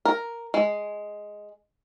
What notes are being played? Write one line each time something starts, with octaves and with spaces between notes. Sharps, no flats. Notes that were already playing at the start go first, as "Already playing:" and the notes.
A#4
G#3